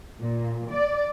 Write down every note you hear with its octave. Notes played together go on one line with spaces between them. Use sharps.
A#2
D5